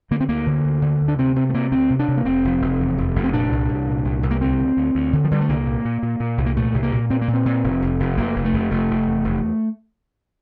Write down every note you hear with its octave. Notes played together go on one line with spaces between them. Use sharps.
D3 A#3
C4
D2 A#3
D3
D2
D3
D2
D4
C3 C4
C3 C4
A3
C3 A#3
D2 C4
C3
D4
C3
A#3
F1 C4
F1
F1
E2
F1
F1
C4
A#2 D4
C2
C2
A#2
C2
C2
A#3
D2 C4
D2
D2
D2
D3
F3
D3 G3
A3
C2 A#3
A#2
A#2
A#2
A#2
C2
A#3
A#2 A3
C2
A#3
A#2
A#2 C4
A#3
A#2
C4
A#2
F1
F1
F1
F1 A#3
F1
A3
F1
F1 A3
F1
E2
F1